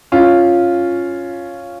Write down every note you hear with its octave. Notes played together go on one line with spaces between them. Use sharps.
C#4 F4